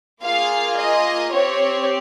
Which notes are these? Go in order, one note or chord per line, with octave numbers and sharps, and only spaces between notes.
A#3 F4 G#4 F5
D#5
C4 G4 C#5